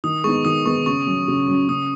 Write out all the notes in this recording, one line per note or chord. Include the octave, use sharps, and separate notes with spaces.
D#3 D#6
G#3 B3 D#4 C#6
D#3 D#6
G#3 B3 D#4 C#6
C#3 C#6
F#3 C#4
C#3
F#3 C#4
C#3 D#6